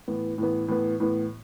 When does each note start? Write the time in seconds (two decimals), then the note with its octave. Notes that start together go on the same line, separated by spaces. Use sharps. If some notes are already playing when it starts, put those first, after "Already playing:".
0.08 A2 E3 B3
0.38 A2 E3 B3
0.68 A2 E3 B3
1.00 A2 E3 B3